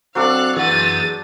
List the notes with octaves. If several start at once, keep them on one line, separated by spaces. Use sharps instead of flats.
F#3 C4 D4 A4 C5 F5 F#6
E3 G#4 F#5 A6 D#7